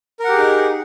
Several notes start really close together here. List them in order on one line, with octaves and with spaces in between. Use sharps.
A#4 F#5 G4 G#4 D#4